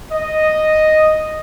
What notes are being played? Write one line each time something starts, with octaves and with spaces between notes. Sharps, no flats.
D#5